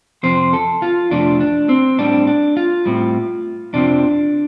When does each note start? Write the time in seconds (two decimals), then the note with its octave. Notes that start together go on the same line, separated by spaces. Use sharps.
0.23 F2 C3 F3 C4 C5
0.53 A4
0.82 F4
1.11 F2 C3 F3 A3 C4 D4
1.40 D4
1.69 C4
1.98 A2 G3 C4 D4
2.27 D4
2.57 F4
2.86 A2 G3 C4
3.73 F2 C3 F3 C4 D4